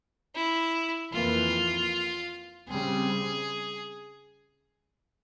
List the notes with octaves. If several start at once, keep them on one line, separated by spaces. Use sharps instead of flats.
E4
F2 E3 A#3 F4
C#3 G3 C4 G#4